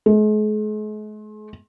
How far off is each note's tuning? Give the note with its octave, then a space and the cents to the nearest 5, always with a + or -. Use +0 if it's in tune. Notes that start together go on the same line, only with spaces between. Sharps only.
G#3 +45